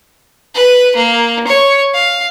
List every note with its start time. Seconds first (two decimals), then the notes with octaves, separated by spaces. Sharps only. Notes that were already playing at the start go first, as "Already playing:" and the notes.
0.55 B4
0.96 A#3
1.47 C#5
1.94 F5